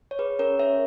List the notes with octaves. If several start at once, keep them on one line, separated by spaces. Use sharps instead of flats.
C#5
G#4 B4
C#4 A#4 C#5
C#4 C#5 E5